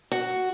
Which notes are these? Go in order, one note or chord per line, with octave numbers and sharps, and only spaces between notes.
F#4